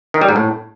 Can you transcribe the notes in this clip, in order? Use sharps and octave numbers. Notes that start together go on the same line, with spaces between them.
D#3
G3
G#2
A2